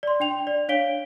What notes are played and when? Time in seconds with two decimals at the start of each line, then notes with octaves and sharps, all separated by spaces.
0.03 D5 C6
0.20 D4 G5 F7
0.47 D5
0.69 D4 C#5 F5 B6 D7 G7